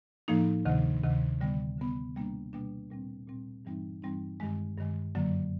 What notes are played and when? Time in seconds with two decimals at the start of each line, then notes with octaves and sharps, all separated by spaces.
0.28 A2 F3 A#3 D#4
0.65 D2 C3 D#3
1.03 D2 C3 D#3
1.41 D3 G3 B3
1.78 D3 G3 B3
2.16 B2 G3 A#3 D4
2.53 B2 G3 A#3 D4
2.90 A#2 G3 C4
3.28 A#2 G3 C4
3.65 G2 E3 G3 C4 D#4
4.02 G2 E3 G3 C4 D#4
4.40 G2 D#3 G#3
4.77 G2 D#3 G#3
5.15 F#2 D3 F#3 A#3